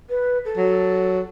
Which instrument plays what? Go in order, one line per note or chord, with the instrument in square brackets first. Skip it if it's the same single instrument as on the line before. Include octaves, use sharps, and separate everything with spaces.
[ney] B4
A4
[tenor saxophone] F#3